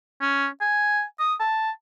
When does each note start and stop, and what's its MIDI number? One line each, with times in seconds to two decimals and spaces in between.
0.21 0.48 61
0.61 1.03 80
1.19 1.34 87
1.40 1.71 81